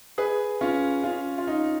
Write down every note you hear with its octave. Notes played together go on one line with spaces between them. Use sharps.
G#4 B4
C#4 F4
C#4 F4
F4
D#4